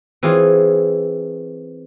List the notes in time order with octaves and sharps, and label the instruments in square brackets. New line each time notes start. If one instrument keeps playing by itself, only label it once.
[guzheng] E3 C4 F4 G#4